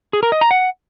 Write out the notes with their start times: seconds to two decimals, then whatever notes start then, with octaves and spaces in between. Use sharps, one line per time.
0.13 G#4
0.23 A#4
0.32 D#5
0.41 A#5
0.51 F#5